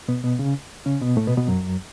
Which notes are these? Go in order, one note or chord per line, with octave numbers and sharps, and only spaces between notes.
B2 B3
B2 B3
C#3 C#4
C#3 C#4
B2 B3
A2 A3
B2 B3
B2 B3
F#2 F#3